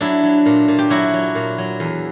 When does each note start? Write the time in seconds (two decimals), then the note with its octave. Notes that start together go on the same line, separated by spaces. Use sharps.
0.01 F#3 D4 E4
0.23 F#3
0.46 A#2
0.68 A#2
0.79 G4
0.90 F#3 E4 F#4
1.14 F#3
1.35 A#2
1.58 F#3
1.80 E2